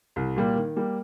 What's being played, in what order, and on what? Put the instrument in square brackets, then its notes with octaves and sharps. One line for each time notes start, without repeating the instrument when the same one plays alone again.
[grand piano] C2
A#2 G3 A#3
D#3
G3 A#3